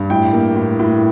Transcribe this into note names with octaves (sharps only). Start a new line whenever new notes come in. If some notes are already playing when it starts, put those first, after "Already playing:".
Already playing: G2
A2 G5
A#3
A2
A2